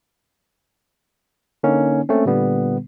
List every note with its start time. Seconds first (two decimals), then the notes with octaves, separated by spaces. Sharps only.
1.63 D3 A#3 C#4 D#4
2.09 A3 A#3 C4 C#4
2.25 A#2 D3 G3 B3